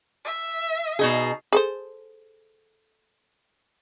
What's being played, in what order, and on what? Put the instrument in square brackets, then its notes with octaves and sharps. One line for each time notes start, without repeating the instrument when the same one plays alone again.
[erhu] E5
[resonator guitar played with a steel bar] B2 D#4 G#4
[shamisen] G#4 A4 C5